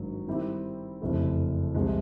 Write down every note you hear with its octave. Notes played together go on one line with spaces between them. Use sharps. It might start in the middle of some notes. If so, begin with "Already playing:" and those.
Already playing: G#1 G2 D#3 F#3
D#3 G3 C4 E4 G4
F#1 F2 C3 E3 A3
C2 C3 F3 G#3